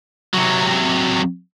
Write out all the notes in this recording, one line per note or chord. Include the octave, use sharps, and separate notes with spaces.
C3 F#3